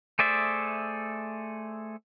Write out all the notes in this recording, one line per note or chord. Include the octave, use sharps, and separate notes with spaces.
A3 G#4 C5 D5 E5